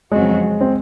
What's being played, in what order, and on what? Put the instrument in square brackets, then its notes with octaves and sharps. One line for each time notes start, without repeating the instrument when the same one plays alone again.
[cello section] F2 C#3 F#3 C4 F#4 [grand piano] G#3
[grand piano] C4